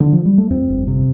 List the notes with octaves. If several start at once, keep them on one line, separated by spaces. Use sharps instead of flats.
D3
F3
G3
A3
F2 C4
G1
C3